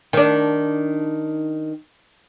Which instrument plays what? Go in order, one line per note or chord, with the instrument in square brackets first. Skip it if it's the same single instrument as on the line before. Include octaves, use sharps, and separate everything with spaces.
[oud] D#3 D4